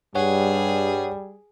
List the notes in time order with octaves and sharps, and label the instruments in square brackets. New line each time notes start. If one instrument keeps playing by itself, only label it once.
[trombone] G2 [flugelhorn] G3 [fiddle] G#4 [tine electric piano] C#5 F#5